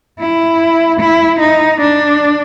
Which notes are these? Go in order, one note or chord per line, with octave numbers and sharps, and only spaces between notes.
E4
E4
D#4
D4